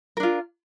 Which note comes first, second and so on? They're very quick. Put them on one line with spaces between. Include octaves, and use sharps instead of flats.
A#4 D4 F4